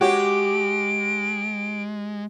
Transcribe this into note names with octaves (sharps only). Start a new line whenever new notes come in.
G#3 F#4 G4 C#5 D7